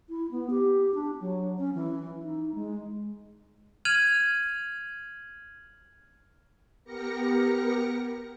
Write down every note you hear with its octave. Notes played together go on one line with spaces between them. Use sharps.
E4
B3
G4
D4
F#3
C#4
E3
D#4
G#3
F6 G#6 D#7 F7 F#7
B3 G4 A#4 A#6 C#7